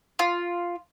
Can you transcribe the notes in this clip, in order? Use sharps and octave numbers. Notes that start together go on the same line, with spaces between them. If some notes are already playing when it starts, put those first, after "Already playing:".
F4